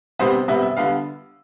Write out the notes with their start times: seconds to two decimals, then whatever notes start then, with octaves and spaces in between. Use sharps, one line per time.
0.19 C3 G3 B3 C5
0.48 C3 G3 B3 E5
0.62 E5
0.77 D3 G3 B3 F5